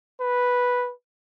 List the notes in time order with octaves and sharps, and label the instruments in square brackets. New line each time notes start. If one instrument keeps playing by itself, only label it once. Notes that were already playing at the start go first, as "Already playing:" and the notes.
[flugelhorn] B4